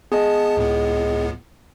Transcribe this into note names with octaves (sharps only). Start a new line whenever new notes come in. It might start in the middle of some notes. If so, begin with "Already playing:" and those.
B3 G#4 D#5 A5
C#2 A2 B3